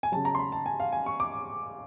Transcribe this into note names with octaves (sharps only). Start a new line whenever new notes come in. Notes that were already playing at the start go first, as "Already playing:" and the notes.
G#5
C#3 F#3 A5
A#5
C6
B5
A5
G#5
F5
G#5
C#6
D6